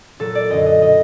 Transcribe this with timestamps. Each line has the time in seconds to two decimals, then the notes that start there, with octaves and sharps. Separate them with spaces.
0.19 A#2 F#3 A4
0.35 D5
0.50 F#2 D3 F#3 D#5
0.66 D#5
0.81 B2 F#3 D#5